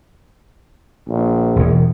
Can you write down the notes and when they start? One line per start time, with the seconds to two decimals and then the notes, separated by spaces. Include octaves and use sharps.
1.08 A#1
1.56 E1 E2